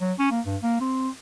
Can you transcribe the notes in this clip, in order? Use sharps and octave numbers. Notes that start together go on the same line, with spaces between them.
F#3
C#4
A#3
G2
A#3
C4